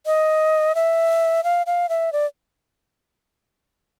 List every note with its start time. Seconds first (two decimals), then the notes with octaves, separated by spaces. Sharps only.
0.06 D#5
0.75 E5
1.44 F5
1.66 F5
1.89 E5
2.13 D5